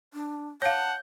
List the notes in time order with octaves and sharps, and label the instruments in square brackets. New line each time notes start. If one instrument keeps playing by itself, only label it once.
[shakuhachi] D4
[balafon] C#5 F5 [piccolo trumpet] F#5 [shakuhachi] A5 [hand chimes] G6